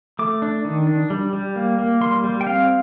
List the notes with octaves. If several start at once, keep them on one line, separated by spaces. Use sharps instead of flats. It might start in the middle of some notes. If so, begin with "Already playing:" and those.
A3 D6
D4
D#3
D4
G3
G3
A#3
A#3
G3 C6
G3
G5
C4 F5